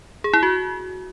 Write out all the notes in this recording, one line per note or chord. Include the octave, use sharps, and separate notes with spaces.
G#4
E4
F#4